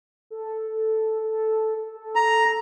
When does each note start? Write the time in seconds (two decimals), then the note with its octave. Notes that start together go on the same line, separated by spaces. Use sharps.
0.30 A4
1.23 A4
1.96 A4
2.15 A#5